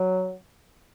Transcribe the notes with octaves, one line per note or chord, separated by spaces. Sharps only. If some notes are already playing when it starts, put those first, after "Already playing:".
Already playing: F#3